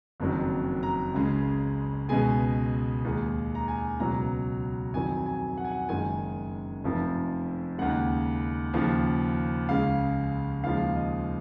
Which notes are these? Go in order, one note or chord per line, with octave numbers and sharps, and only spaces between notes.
F#1 F2 D#3 F#3
A#5
C#2 C#3 G#3
C#2 B2 G#3 G#5
D#2 D#3 G#3
A#5
G#5
C#2 B2 F#3 A#5
F2 D#3 F#3 G#5
G#5
F#5
G#5
F#5
F#1 F#2 D#3 G#3 G#5
F1 F2 F3
D#2 C#3 G#3 F#5
D#2 C#3 F3
C#2 C#3 G#3 F5
D#2 C#3 F3 G#3 F5
D#5